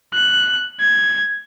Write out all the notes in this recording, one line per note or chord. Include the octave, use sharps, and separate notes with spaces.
F#6
G#6